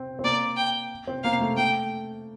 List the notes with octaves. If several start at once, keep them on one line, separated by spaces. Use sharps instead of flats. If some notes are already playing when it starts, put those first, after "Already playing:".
Already playing: C4
C4
A#3 D5
G5
C4
A#3 F5
A3
A3 G5